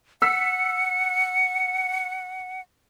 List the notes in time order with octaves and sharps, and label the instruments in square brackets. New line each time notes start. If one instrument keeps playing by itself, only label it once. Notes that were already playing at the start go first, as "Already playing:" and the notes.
[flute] F#5 [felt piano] E6 B6 [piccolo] C#7